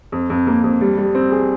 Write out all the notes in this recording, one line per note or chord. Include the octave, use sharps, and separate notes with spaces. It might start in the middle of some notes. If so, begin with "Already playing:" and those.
F2
F2
A#3
F2
G3
G3
C4
G#4